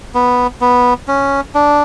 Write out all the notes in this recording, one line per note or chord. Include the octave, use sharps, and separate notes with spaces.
B3
B3
C#4
D4